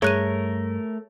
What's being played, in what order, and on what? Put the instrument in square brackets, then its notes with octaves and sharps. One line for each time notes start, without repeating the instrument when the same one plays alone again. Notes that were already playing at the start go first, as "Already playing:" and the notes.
[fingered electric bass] G2 [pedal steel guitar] A3 A#4 [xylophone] G#4 F#6 D#7 [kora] C#5